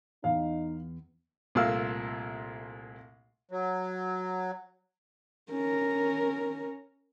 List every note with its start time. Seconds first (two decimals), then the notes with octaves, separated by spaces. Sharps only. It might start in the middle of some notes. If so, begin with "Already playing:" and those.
0.24 E2 D#4 F5
1.55 C2 A#2 A3 F5 E6 F6
3.51 F#3
5.51 C#4 A#4